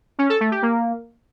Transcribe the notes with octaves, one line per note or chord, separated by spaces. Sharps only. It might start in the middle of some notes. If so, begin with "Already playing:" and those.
C#4
A4
A3
G4
A#3